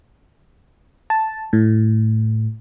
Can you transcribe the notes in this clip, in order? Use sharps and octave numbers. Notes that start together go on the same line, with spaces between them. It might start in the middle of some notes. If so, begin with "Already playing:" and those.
A5
A2